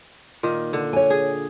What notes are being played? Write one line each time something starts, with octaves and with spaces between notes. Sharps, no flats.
A#2 D#3
D3
C#5 G#5
G#4